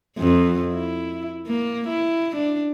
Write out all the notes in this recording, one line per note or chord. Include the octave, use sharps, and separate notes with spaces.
F2
E4
A#3
E4
D4